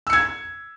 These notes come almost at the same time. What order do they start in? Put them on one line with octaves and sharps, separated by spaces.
E6 C#7 G#6